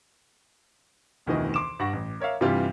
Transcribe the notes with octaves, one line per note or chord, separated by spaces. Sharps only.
F1 D2 B2 D#3 E3 D#5
C6 D6 E7
G2 F#5 C#6 A#6
A1
A#4 C#5 E5 F5
G2 C3 E3 G3 F4 G4